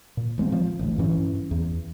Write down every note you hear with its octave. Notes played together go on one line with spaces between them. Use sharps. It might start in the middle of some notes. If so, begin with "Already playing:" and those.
A#2
A1 G#3 A3 C4
F3
A1 D2
G2 E3 C#4
E2